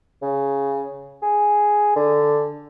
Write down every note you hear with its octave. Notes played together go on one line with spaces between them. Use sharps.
C#3
G#4
D3